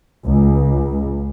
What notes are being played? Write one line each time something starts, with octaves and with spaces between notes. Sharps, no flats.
C#2